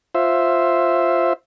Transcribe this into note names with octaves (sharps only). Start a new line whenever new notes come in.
F4 C5 E5